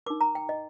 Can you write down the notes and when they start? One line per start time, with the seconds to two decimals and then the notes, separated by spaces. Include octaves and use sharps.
0.06 D#4 A#4 D6
0.21 A#5
0.35 G5
0.49 D#5